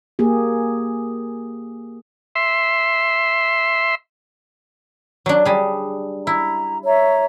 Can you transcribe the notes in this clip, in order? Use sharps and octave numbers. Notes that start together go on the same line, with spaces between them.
A#3 G4 G#4
E5 C6
F#3 D4
G3 G#4
E4 A#5
C#5 E5 A#5